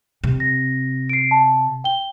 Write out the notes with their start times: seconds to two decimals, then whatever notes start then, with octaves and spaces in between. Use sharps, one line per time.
0.24 C3
0.40 A#6
1.09 C7 D7
1.31 A5
1.84 G5 G7